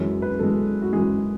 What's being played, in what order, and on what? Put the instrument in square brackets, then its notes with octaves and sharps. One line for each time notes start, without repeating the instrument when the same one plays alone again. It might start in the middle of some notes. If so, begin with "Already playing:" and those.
Already playing: [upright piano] F#2 E3 G#3 C#5
B4
F#2 E3 G#3 A4
F#4
F#2 E3 G#3 G#4